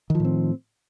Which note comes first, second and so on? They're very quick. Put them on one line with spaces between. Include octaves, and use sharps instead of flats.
D#3 F3 A2 C4